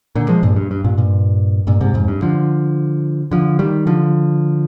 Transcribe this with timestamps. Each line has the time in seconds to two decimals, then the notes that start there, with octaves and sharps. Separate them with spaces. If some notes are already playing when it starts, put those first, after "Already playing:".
0.15 A#2 D3
0.29 F3 G#3
0.43 G2 A#2
0.56 G2
0.71 G2
0.84 G2 A#2
0.98 G2 A#2
1.67 G2 A#2
1.81 G#2 C3
1.94 F2 G#2
2.08 G2
2.22 D3 F3
3.31 D3 F3
3.59 D#3 G3
3.87 D3 F3